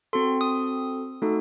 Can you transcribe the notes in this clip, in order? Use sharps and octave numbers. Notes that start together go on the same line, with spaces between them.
C4 F#4 A4 C6
D#6
A3 D#4 F#4 A4